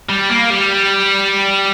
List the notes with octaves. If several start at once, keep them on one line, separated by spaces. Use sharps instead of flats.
G3
A#3
G3